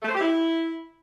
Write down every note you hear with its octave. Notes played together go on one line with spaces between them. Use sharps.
A3
C5
G4
E4